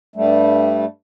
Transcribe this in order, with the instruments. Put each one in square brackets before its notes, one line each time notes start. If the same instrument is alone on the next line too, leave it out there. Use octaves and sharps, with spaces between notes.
[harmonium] G2 G3 A3